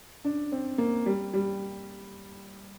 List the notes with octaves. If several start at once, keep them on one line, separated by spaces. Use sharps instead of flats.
D4
C4
A#3
G3
G3